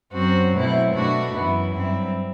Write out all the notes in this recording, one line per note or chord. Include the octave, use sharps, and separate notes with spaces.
F#2 F#3 C4 F#4
B2 F#3 A3 C4 E4
B2 A3 D4 F#4
F#2 E3 B3 E4
G2 F#3 C4 E4